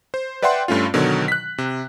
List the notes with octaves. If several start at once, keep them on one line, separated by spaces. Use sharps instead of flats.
C5
B4 D5 E5 F#5 G5 C6
G2 A3 C#4 F4
B2 D3 D#3 F#3
F#6 B6
C3